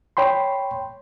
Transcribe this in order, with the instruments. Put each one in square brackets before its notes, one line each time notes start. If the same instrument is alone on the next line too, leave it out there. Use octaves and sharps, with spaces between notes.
[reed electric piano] C#5 G5 B5 C6